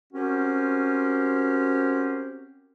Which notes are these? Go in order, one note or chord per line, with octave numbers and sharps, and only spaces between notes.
C4 C#4 F#4 G4 A#4 C5